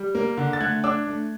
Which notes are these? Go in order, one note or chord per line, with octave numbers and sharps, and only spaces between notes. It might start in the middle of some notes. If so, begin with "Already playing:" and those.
Already playing: G3
A#3
D3
A6
A3 F#6 G#6
D4 D6 E6
A3